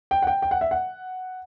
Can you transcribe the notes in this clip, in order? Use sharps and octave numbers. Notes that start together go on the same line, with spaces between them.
G5
F#5
G5
G5
F#5
E5
F#5